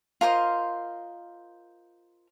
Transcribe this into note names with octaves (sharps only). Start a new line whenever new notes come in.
F4 A#4 C5 D#5